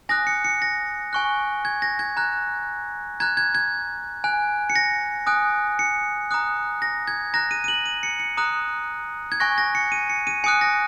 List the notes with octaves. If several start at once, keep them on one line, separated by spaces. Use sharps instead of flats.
G#5 D#6 F#6 A#6
C#7
C#7
A#6
G#5 C#6 F#6
G#6
A#6
G#6
A#5 F#6
A#5 F#6 G#6
G#6
G#6
G#5 F#6
C#7
A#6
G#5 D#6 F#6
C#7
A#5 D#6 F#6
A#6
G#6
A#5 F#6 A#6
D#7
D#7
F#7
D#7
C#7
C#7
A#5 D#6 F#6
G#6
G#5 C#6 F#6 A#6
A#6
C#7
D#7
C#7
D#7
G#5 D#6 F#6 C#7
A#6